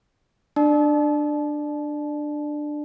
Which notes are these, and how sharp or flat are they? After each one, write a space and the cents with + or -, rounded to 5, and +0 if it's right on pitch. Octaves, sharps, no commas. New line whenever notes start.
D4 +15 D5 +25 A5 -30